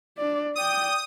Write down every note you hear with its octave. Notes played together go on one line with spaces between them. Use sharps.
D4 D5
D5 G5 D#6